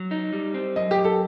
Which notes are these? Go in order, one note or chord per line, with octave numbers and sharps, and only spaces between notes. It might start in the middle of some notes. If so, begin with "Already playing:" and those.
Already playing: F#3
D#4
G3
C4
F#2 D#5
G4
F#2
A4